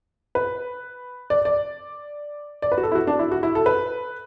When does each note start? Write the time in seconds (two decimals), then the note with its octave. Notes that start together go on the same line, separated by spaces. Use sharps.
0.35 B4
1.30 D5
1.45 D5
2.62 D5
2.72 B4
2.78 F#4
2.83 A4
2.92 E4
2.95 F#4
3.07 D4
3.19 E4
3.32 F#4
3.43 E4
3.55 A4
3.66 B4